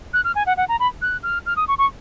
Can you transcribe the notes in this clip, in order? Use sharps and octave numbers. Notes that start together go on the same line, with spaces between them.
F#6
F6
G#5
F#5
F#5
A#5
B5
F#6
F6
F6
D#6
C#6
C#6